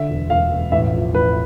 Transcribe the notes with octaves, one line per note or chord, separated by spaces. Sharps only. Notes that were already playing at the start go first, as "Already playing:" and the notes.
Already playing: D3 E5
E1
E1 F5
E1
A1 E5
F3
A1 B4